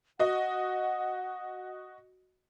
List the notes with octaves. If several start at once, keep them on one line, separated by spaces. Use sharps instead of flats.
F#4 D#5 F#5